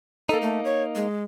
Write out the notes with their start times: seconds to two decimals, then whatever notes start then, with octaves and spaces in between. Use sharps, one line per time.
0.29 A#3 D#4 A4
0.42 A3
0.65 C#5
0.95 G#3